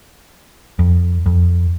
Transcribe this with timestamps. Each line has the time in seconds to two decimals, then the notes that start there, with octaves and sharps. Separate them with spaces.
0.79 F2
1.26 F2